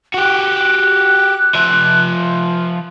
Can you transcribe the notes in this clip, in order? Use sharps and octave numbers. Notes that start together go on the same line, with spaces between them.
F#4 G4 F#6
F3 E5